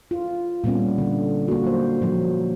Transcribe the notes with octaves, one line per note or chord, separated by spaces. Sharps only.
F4
A#2 G3 B3 C#4
D3
A#3 F#4
F#3 C5
A#2 F3 F#3